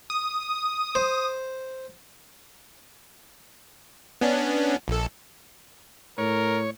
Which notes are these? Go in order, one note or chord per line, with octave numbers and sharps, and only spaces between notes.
D#6
C5
B3 C#4 D4
A#1 A4
A2 A#4 C#5